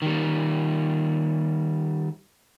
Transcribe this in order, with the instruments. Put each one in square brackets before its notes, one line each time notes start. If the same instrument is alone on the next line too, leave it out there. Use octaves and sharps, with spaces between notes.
[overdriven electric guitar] D#3 G3